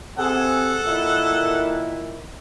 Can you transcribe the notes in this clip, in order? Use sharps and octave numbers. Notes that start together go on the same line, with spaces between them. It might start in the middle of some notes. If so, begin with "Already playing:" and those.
C3 C4 G#4 A4 F#5
A#2 D#3 E4